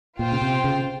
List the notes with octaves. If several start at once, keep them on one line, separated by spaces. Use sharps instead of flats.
A#2 F4 C5 G5
C#3
C3
C#3